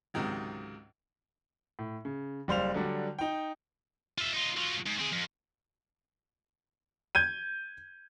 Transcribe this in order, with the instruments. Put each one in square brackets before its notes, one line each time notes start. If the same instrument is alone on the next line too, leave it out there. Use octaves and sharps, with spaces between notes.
[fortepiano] C#2 G#2 C3 D#3 F#3
[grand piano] A2
C#3
F#1 G3 C5 F5 F7
D3 F#3 G3 D4
D#4 G5
[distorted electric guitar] F4 E5
D#4 F4
F#3 F4
G#2
C4 G#4
F2
[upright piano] G6 G#6 D#7